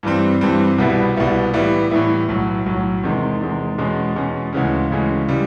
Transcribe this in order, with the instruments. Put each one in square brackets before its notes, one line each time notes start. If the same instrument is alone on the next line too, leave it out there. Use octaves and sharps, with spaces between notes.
[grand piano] G2 E3 G3 C4
G2 E3 G3 C4
C2 B2 G3 B3 E4
C2 B2 G3 B3 E4
A2 E3 G3 B3 E4
A2 E3 G3 B3 E4
B1 A2 F#3
B1 A2 F#3
E2 C3 D#3 G#3
E2 C3 D#3 G#3
E2 B2 G#3 C#4
E2 B2 G#3 C#4
D2 C#3 E3 G#3 C#4
D2 C#3 E3 G#3 C#4
C#3 E3 G3